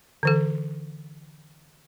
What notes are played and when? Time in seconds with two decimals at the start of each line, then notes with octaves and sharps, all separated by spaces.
0.23 D3 E3 A4